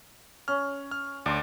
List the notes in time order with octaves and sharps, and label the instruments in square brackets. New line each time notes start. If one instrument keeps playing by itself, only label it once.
[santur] C#4 [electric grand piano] F6
[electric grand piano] F6
[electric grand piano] D2 [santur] D5 C6